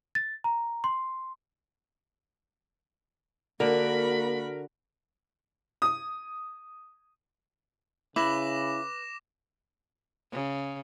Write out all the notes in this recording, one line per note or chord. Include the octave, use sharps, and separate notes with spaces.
A6
A#5
C6
D3 A#3 F#4 A#4 B5
D#6
C#3 E4 B4 D6 A#6 E7
C#3